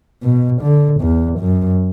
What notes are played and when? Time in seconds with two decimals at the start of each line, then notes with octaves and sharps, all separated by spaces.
0.23 B2
0.62 D3
1.01 E2
1.40 F#2